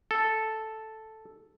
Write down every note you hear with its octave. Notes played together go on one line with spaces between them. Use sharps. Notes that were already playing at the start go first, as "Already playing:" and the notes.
A4